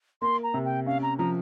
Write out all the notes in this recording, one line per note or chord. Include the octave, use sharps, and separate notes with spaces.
A#3 C6
A#5
C3
G5
C#4 F5
A#5
F3 A#5